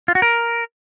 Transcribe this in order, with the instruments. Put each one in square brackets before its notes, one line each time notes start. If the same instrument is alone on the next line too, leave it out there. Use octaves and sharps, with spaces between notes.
[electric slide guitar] F4
F#4
A#4